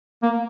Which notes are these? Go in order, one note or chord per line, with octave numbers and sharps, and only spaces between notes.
A#3